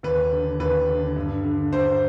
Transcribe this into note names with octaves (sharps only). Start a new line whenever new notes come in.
D#2 B4
D3
D#2 B4
D3
G2
D3
G2 C5